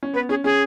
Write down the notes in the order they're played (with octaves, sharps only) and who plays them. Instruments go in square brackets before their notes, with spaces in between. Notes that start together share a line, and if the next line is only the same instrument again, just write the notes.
[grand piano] C#4
[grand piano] B3 [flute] B4
[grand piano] C#4 [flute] G#4
[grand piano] C#4 [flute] G#4